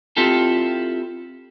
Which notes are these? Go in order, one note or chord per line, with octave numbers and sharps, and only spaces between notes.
C4 E4 F4 G4 A4